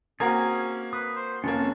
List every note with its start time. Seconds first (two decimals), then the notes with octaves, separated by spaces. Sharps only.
0.20 A#3 C4 C#4 F#4 G#4 G#5 A#5
0.93 B4 D#6
1.16 C5
1.44 F1 F2 A#3 C#4 A5